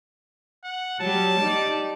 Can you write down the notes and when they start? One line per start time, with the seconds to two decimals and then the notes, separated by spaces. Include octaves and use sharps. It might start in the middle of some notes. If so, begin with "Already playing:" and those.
0.64 F#5
1.00 F#3 G3 A5
1.40 G3 D#4 D5